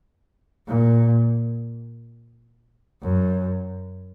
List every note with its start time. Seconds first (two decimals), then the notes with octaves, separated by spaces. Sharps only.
0.68 A#2
3.03 F#2